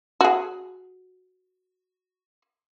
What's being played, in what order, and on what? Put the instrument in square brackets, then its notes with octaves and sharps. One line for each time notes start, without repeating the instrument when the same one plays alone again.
[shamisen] F#4 G#4